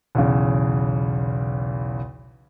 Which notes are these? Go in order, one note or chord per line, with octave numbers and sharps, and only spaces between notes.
B1 E2 C#3